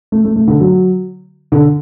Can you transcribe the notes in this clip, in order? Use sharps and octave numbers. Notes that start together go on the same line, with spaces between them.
A3
A3
A3
D3
F#3
D3